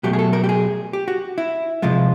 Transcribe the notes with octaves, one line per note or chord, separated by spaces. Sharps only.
B2 F#3 A3 G4
G#4
A4
A#4
G4
G#4
G4
F#4
E4
C3 F3 G#3 F4